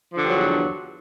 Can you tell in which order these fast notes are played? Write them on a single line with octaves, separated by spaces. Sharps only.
F3 D3 G2 F#3 E2